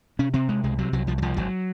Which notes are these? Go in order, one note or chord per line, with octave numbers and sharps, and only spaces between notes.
C3 C#4
C3 C4
C3 G#3
C2 G#3
C3 F#3
C2 F#3
C2 F3
F#3
C2 F3
G#1 F#3